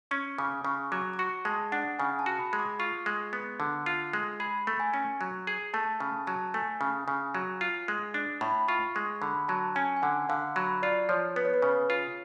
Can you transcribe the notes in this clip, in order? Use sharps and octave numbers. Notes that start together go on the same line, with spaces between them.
C#4 C#6
C#3 D6
C#3 C#6
F#3 D6
D6
F#4 C#6
G#3 A5
D4 F#5
C#3 G#5
A5
F#4
B5
G#3
D6
F4 C#6
G#3
B3
D3
F4
G#3
G#4 B5
A3
G#5
C#4
F#3
G#4
A3 A5
C#3 A5
F#3 A5
A3 G#5
C#3
C#3
F#3
F4
G#3
D4
A2 B5
F4 C#6
G#3 C#6
D3 B5
F#3 A5
C#4 G#5
G#5
D3 F#5
D3 F5
F#3 B5
F4 D5
F3 C#5
B3 B4
C#5
B4
C#3 C#5
F4